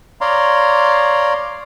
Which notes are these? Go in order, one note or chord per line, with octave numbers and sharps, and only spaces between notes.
C#5 D5 F5 A#5 C6